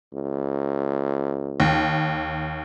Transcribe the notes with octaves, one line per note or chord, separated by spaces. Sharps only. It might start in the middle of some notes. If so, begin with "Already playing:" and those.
C#2
D#2